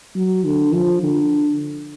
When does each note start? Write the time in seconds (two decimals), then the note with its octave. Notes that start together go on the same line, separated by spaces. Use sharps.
0.15 F#3
0.45 D3
0.73 F3
1.03 D3